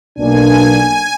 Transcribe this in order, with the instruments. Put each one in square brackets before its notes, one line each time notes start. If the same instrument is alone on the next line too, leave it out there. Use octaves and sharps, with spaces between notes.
[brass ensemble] B1 B2 A#3 D4 [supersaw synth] G#5